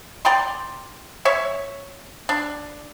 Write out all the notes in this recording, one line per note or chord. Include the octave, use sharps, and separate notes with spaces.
D5 G5 A#5 C6
C#5 E5
D4